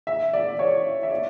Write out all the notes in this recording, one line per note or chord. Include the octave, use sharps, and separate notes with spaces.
E5
D5
C#5
E5
D5